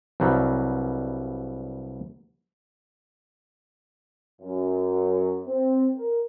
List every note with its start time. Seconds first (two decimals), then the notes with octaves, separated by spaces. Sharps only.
0.20 C2 G2 F#3 G3
4.42 F#2
5.47 C4
5.97 A#4